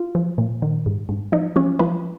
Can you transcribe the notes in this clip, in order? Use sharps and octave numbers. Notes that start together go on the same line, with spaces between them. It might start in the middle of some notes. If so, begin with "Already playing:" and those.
Already playing: F4
F3
A#2
D#3
G#2
G#2
F3 D#4
F3 C#4
F3 B4